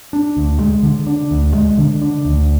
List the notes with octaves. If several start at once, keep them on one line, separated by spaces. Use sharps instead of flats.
D4
D2
G#3
D3
D4
D2
G#3
D3
D4
D2